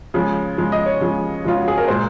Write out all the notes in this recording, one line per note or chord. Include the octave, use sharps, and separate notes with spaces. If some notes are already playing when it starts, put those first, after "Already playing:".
C#3 F3 G#3
C#3 F3 G#3
D#5
C#5
C#3 F3 G#3
C#3 F3 G#3 F4
F#4
G#4
A#4
A#2 G#3 C5